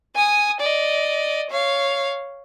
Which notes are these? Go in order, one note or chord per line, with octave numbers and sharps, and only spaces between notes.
G#5 D#6
D5 D#5
C#5 F5